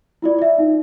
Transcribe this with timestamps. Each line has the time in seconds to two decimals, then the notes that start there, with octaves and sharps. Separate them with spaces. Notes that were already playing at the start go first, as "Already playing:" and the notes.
0.22 E4 F4 D5
0.39 D5 E5
0.58 D#4